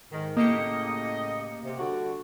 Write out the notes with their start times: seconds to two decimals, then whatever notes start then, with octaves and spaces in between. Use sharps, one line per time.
0.12 G#2 D#3
0.37 A2 C#3 A#3 G4 D#5 C#7
1.64 C3
1.77 D3 G3 F#4